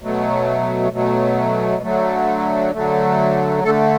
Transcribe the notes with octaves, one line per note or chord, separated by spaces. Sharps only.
B2 F#3 A3
B2 F#3 A3
D3 F#3 A3
D3 F#3 A3
D3 A3 A4